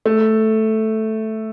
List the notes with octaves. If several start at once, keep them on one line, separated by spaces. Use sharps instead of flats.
A3